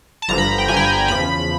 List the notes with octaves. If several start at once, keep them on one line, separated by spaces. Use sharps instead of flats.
A5
G1 G2 D3 F3 A#5
B5
G5
G1 G2 D3 F3 G#5
G5
G#5
E2 C#3 F3 B5